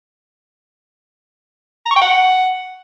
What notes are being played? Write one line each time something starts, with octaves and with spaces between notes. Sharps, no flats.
A#5
C#6
G5
F#5